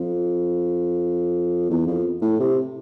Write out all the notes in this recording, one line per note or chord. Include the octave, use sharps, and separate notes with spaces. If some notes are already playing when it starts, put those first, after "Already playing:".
Already playing: F2
E2
F2
A2
C3